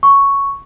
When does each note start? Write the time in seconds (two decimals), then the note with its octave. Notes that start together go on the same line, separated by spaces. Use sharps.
0.03 C#6